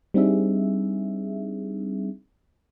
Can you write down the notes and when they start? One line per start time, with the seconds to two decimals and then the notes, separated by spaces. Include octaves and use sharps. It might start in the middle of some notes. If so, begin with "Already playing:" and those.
0.14 G3 C4 D4 D#4 G#4 E5